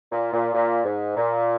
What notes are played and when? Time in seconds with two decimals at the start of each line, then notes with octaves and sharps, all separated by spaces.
0.11 A#2
0.33 A#2
0.54 A#2
0.84 G#2
1.16 A#2